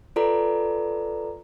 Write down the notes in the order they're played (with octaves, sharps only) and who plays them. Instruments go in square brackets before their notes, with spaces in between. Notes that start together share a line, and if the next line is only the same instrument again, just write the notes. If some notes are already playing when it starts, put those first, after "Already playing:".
[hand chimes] F4 A4 B4 D5 A#5